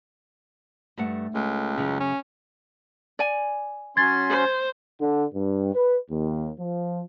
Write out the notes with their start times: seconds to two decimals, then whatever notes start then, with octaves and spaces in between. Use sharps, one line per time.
0.97 G2 A3 F#5
1.35 C#2 A3
1.77 F#2 C#3
2.00 C#4
3.19 D5 G#5
3.97 F#3 C#4 C6 G#6 A6
4.30 C5
5.00 D3
5.33 G2
5.74 B4
6.11 D#2
6.59 F3